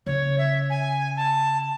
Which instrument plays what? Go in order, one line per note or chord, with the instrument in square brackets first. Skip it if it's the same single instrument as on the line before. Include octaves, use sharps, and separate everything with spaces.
[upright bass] C#3 [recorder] C#5
[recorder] E5
G#5
A5